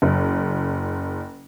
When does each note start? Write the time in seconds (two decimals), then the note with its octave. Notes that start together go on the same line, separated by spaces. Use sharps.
0.02 F#1